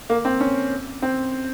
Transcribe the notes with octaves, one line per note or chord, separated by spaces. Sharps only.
A#3
C4
C#4
C4